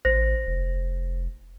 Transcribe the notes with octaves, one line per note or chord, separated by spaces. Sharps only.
A1 C5 A#6
F1